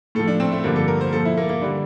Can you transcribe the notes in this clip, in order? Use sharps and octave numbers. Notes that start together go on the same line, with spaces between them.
A2 F3 A4
D4
C4
A3
G2 D3 F3 A#3
A4
A#4
C5
A#2 F3 A4
E4
A#3
A#3
D3 G3 D4